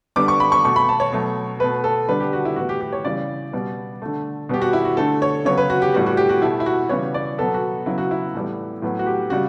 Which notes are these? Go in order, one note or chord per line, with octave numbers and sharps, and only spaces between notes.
D3 G3 B3 D6
C#6
B5
C#6
B2 A3 C#6
B5
A5
C#5
B2 F#3 A3
B2 A3 B4
A4
D3 G3 B3 B4
G4
F#4
E4
A2 E3 B3 F#4
G4
G4
C#5
C#3 E3 G3 D5
B2 G3 B3
D3 A3
B2 G3 B3 G4
F#4
E4
F#4
D3 A3 A4
C#5
C#3 F#3 B3 C#5
B4
F#4
G4
A2 G3 B3 F#4
F#4
G4
F#4
B2 A3 E4
E4
F#4
C#3 E3 G3 B3 C#5
D5
B2 F#3 B3 A4
F#4
C#3 F#3 B3 E4
F#4
E4
A2 E3 G3 B3
A2 F#3 B3
F#4
G4
C#3 G3 F#4